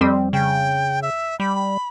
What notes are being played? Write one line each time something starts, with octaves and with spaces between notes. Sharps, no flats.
F2 G3 C4
C#3 G5
E5
G3 B5